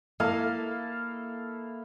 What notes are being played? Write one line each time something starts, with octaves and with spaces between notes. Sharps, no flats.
A#3 E4 A4 F5